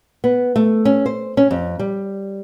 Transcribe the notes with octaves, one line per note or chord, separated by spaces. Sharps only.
B3
A3
C#4
C5
C#4
F2
G3